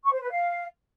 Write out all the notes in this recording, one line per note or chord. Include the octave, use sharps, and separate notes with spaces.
C#6
C5
B4
F5